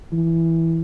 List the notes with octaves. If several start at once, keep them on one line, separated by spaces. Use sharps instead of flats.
E3